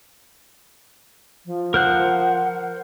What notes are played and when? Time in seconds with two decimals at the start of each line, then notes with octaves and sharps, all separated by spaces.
1.46 F3
1.74 A#4 C5 F#5 F#6